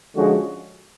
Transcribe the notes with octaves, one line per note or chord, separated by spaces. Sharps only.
D3 F3 G#3 C#4 F#4